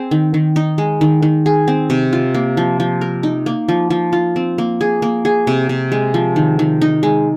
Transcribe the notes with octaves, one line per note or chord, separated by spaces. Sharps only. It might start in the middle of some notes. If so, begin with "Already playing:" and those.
Already playing: C4 G#4
D#3
D#3
D#4
G#3
D#3
D#3
G#4
C4
C3
F4
A#3
F3
F3
A#4
D#4
A#3
F3
F3
F4
C4
A#3
G#4
A#3
G#4
C3
C3
G#3
F3
D#3
D#3
D#4
G#3